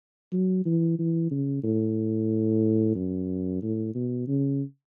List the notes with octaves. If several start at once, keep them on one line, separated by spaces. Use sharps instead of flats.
F#3
E3
E3
C#3
A2
F#2
A2
B2
C#3